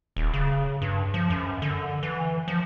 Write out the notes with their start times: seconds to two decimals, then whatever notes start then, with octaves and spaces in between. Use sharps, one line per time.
0.16 D#1
0.33 C#3
0.82 G2
1.14 F3
1.30 F#2
1.62 D3
2.03 E3
2.48 F3